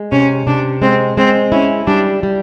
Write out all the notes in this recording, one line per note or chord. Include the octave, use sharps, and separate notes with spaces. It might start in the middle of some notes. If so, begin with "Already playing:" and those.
Already playing: G#3
C3 C#4
C3 D4
G#3 C4
G#3 C4
C#4 E4
G3 D4
G3